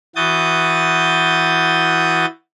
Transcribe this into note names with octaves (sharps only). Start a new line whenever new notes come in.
E3 F#4 D#6 G6 A6